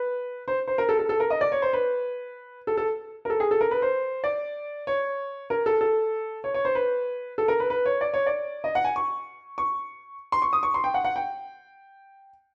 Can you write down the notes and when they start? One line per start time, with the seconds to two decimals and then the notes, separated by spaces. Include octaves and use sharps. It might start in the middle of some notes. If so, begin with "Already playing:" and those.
Already playing: B4
0.48 C5
0.68 C5
0.78 A#4
0.89 A4
0.99 A4
1.09 A4
1.20 A#4
1.30 D#5
1.41 D5
1.52 C#5
1.62 C5
1.73 B4
2.67 A4
2.77 A4
3.25 A#4
3.30 A4
3.40 G#4
3.51 A4
3.61 A#4
3.71 B4
3.82 C5
4.24 D5
4.87 C#5
5.50 A#4
5.66 A4
5.81 A4
6.44 C#5
6.54 C#5
6.65 C5
6.75 B4
7.38 A4
7.48 A#4
7.60 B4
7.70 B4
7.86 C#5
8.01 D5
8.14 C#5
8.26 D5
8.64 D#5
8.75 F#5
8.85 G#5
8.96 C#6
9.58 C#6
10.32 C6
10.42 C#6
10.53 D#6
10.63 C#6
10.74 C6
10.84 G5
10.94 F#5
11.05 F#5
11.16 G5